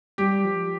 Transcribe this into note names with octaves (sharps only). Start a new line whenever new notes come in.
G3 G4
F3